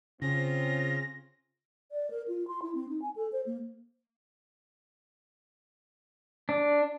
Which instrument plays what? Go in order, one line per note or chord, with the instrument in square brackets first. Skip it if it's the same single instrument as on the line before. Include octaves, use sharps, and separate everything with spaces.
[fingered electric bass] C#3 [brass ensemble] C4 F4 [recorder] A#6
[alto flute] D5
A#4
F4
C6
E4
C4
D#4
G#5
A4
C5
A#3
[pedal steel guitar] D4